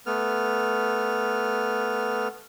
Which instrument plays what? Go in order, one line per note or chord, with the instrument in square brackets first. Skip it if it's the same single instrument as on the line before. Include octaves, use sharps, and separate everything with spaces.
[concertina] A3 B3 F6